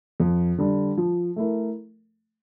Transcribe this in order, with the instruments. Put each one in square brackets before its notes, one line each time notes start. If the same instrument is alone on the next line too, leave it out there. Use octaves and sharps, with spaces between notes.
[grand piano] F2
D3 G3
F3
A3 E4 A#4